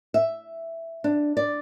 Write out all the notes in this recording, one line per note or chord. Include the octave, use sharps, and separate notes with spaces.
E5
D4
D5